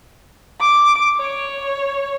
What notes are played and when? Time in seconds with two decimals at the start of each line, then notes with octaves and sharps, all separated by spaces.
0.61 D6
1.18 C#5